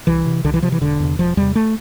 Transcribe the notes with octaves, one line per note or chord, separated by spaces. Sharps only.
C2 E3
C3
C2 D3
E3
C3 F3
E3
E1 D3
E2 C3
E1 F3
E2 C3 G3
A3